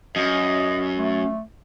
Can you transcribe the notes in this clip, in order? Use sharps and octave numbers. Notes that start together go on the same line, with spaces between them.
F#2 D#5
A3